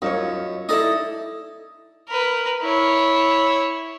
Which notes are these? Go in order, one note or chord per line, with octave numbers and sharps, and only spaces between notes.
F#2 D#4 F4 C#5
D#4 E4 A4 D5 D#5
A#4 B4
E4 C#5